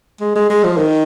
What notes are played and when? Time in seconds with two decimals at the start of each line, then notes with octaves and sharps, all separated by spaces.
0.20 G#3
0.35 G#3
0.50 G#3
0.64 F3
0.77 D#3